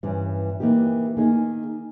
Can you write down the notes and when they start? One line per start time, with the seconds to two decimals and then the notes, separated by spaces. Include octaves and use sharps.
0.03 G2 E3 G3 C#4
0.60 E3 A#3 D#4 G4
1.17 D#3 A#3 D#4 G#4